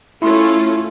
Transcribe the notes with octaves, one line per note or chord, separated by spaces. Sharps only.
A3 C#4 E4 F4 C6